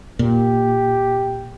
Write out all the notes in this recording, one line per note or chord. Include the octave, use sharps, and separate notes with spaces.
A#2 G4